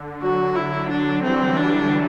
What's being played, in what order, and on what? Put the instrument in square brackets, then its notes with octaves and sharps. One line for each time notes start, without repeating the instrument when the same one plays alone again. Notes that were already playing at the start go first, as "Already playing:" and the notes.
Already playing: [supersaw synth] D3
[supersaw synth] D3 F#3 [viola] F#4
[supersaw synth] D3 [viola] E4
[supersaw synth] D3 F#3 [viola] D4
[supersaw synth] E3 G3 [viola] C4
[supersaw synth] E3 G3 [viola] D4